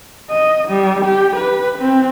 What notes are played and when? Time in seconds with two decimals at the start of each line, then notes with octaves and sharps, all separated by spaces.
0.30 D#5
0.69 G3
1.05 G4
1.36 B4
1.78 C4